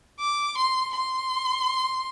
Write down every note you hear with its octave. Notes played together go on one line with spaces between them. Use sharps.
D6
C6
C6